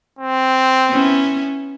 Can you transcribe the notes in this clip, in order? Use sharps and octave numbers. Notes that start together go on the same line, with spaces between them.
C4
B3 C#4 E4